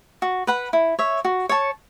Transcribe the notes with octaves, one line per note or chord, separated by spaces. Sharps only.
F#4
B4 F#5 B5
E4
C#5 E5
F#4
C#5 A5 C#6